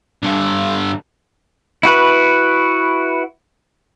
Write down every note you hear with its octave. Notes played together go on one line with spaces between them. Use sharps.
G2 D3
E4 F#4 B4